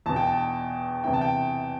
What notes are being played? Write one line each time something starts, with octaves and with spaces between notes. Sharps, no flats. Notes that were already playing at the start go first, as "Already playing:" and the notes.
E2 B2 A5
G5
A5
E2 C3 E3 G5
A5
G5